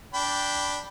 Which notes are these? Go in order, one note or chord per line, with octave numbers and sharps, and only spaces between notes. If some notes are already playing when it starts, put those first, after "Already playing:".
D4 G5 B5